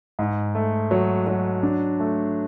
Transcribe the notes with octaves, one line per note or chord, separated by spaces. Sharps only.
G#2
A3
F#3
F#3
D4
A3